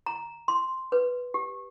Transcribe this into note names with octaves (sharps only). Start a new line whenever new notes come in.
A#5
C6
B4
G4